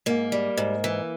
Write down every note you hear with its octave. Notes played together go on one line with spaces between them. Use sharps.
G#2 A#3
G3
G#2
E3